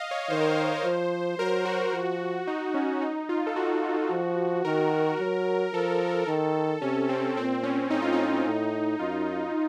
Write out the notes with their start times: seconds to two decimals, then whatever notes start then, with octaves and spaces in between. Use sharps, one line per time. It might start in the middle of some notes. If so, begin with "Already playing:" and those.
Already playing: D#5 F5
0.11 C#5
0.30 D#3 C5
0.41 A#4
0.51 C5
0.85 F3
1.38 F#3 A#4
1.65 F#4
1.93 F3
2.47 D#4
2.74 C#4
3.01 D#4
3.29 F4
3.47 A4
3.56 F#4
4.11 F3
4.65 D#3 A#4
5.19 F#3
5.73 F3 A4
6.27 D#3
6.82 C3 C#4
7.09 C4
7.37 A#2 C4
7.63 C#4
7.90 A2 D#4
8.02 F4
8.12 D#4
8.45 A2
8.99 F#2 F4